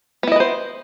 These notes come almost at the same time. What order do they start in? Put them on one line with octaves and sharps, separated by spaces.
B3 E4 D#5 B4 C5